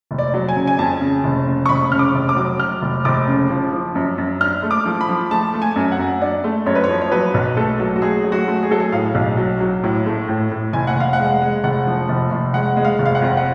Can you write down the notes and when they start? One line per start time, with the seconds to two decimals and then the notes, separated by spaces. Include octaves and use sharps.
0.11 F1
0.19 D5
0.34 F#3
0.49 G#5
0.56 C#3
0.67 G#5
0.79 F2 A5
1.01 C#3
1.24 F1
1.47 C#3
1.66 C#6
1.69 F1 B5
1.91 C#3 F6
1.99 D6
2.15 F1
2.29 D6
2.36 F#3
2.59 F#3 F6
2.82 F1
3.05 F1 D6
3.28 C#3
3.50 F3
3.72 F3
3.95 F#2
4.18 F#2
4.41 D4 F6
4.63 A3
4.71 D6
4.86 F3
5.01 B5
5.09 F3
5.31 A3 A5
5.54 A3
5.62 G#5
5.76 F#2
5.92 F#5
5.99 F#2
6.22 D4 D5
6.44 A3
6.66 F#2 C#5
6.75 B4
6.84 C#5
6.89 F3
7.02 C#5
7.12 F#3 B4
7.34 B1
7.57 A3 A4
7.80 F#3
7.96 F#4
8.02 A3 G#4
8.24 F#3
8.32 F#4
8.48 A3
8.63 G#4
8.71 F#3 A4
8.80 G#4
8.92 A2 F5
9.15 B1
9.37 F#3
9.61 F#3
9.84 A2
10.06 A3
10.29 A2
10.51 A2
10.73 F1 G#5
10.87 F#5
10.96 F1 F5
11.13 F#5
11.19 G#3
11.41 G#3
11.64 F1 F#5
11.87 F3
12.09 F1
12.31 F1
12.54 G#3 F#5
12.77 G#3
12.85 F5
12.99 F1
13.06 F5
13.15 F#5
13.22 F2
13.37 F#5